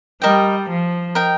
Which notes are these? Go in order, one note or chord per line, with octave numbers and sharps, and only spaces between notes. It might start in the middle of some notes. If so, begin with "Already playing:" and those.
G3 A#4 D#5 G5
F3
A#4 D#5 G5